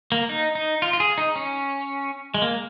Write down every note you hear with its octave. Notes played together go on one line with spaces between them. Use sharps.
A#3
D#4
D#4
F4
F4
G#4
D#4
C#4
G#3
A#3